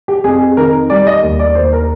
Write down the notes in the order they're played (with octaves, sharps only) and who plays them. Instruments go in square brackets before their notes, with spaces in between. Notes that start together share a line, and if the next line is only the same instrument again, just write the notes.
[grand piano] G4
F2 G#4
D#3 A#4
G3 D5
D#5
D#2
D5
D#2 C5
A#4